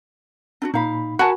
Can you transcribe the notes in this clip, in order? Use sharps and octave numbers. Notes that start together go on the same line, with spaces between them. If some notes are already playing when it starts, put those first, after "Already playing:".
D4 E4 F#4
A#2 D#4 F5 B5
F#4 A#4 F#5 G#5 A5 B5